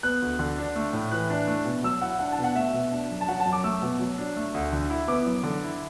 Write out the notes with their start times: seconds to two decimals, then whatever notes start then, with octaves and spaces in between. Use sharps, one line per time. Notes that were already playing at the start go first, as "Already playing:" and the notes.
0.03 B3 F#6
0.22 D2
0.39 D3
0.58 D4
0.76 A3
0.93 A2
1.11 E3 F#6
1.30 D4
1.47 A3
1.65 B2
1.83 F#3 E6
2.02 E4 F#5
2.19 D4 F#5
2.32 A5
2.38 B2
2.44 F#5
2.56 A3 E5
2.74 B2
2.91 D4
3.10 F#2
3.21 A5
3.28 F#3 F#5
3.40 A5
3.46 F#2
3.52 D6
3.64 A3 E6
3.82 B2
3.99 F#3
4.18 D4
4.36 A3
4.54 D2
4.72 D3
4.90 E4
5.08 B3 D6
5.26 F#2
5.43 D3
5.62 E4